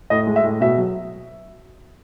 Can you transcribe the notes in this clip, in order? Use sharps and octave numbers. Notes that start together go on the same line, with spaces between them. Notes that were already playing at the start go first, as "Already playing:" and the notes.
A2 D#5
G#3
E5
A2
B2 E5
F#3